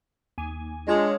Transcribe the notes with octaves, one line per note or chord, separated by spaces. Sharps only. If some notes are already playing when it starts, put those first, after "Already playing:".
D#2 G#5
G#3 D4 F4 C#5